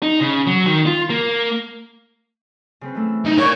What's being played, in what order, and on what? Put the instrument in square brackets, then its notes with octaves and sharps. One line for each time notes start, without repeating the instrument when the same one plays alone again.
[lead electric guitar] D#4
C#3
F#3
D#3
F4
A#3
[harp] C#3 C4 B4
E3 A3 E6
[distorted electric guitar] D#4 E4
[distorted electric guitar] A#4 D5 [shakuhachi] C#5